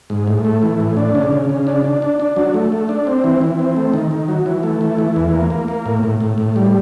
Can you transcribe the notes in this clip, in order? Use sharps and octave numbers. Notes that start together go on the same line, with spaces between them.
G#2
A2
A3
E3
A2
D4
C#3
C#3
C#3
D4
D4
D4
D4
F#3
A3
A3
D4
C4
E3
E3
C4
A3
D#3
D#3
F#3
E3
A3
E3
E3
E2
A#3
A#3
A#3
A2
A2
A2
A2
G3